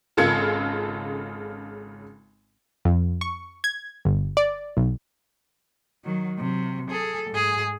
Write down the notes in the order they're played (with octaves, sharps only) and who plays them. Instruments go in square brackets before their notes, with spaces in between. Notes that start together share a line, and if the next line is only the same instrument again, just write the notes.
[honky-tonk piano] G#1 C#3 F4 A4 G#6 C#7
[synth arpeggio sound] F2
C#6
G#6
G1
D5
B1
[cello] D#3 F#3
C3 F#3
G#4 A4
G#2 G#4